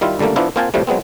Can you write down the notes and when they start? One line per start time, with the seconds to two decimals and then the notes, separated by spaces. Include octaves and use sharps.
0.01 D#3 G3 E4 F4
0.19 C#2 D3 G3 A3 A#3
0.36 F3 B3 D4 E4 F4
0.56 A#3 C4 F4 C5 G#5 A5
0.74 A2 C3 F3 G3 A3
0.87 F#3 G#3 B3 C4